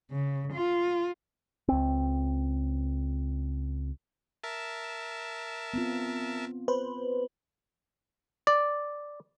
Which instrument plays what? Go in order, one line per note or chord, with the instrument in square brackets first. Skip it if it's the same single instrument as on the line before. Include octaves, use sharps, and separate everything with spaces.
[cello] C#3
F4
[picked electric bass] C#2 C4
[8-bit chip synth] A#4 E5 A5
[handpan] B3 C4 F4
[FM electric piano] B4 C5
[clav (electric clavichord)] D5